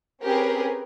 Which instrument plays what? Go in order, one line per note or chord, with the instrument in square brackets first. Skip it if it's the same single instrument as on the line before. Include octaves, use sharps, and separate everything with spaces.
[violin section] C4 C#4 G4 G#4 A#4 B4